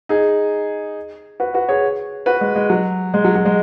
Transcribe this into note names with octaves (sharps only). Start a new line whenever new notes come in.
D#4 G#4
F#4 B4
F#4 B4
G#4 C#5
F#4 B4
G#3
G#3
F#3
G#3
F#3
F#3
G#3